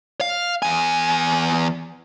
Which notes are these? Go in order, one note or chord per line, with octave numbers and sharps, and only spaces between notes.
F5
E2 G#5